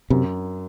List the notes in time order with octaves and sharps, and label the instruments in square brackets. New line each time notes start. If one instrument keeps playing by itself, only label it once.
[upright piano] F#2 [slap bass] C3